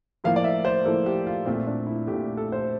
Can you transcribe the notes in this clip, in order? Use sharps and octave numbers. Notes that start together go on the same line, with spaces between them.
A2 F3 A#3 F5
D5
E5
C5
A2 F3 A#3 A4
G4
F4
A#2 A3 C4
D4
E4
A#2 A3 G4
A4
C5